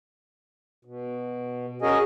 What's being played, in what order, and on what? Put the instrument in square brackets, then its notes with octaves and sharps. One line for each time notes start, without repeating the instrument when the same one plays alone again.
[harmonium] B2
C#4 F#4 G#4 A#4 D#5 G#5